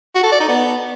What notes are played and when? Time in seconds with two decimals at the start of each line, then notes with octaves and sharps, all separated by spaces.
0.15 F#4
0.23 A4
0.32 D5
0.40 D#4
0.48 B3